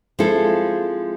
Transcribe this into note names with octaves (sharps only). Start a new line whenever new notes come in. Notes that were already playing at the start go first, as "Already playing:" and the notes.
F3 G#3 C4 E4 A4